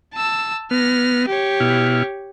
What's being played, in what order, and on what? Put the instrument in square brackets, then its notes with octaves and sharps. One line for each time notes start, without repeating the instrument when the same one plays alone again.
[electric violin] A5 E6
[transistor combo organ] B3 [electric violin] F6 A#6
[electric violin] G4 C#5
[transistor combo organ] B2 E4 F6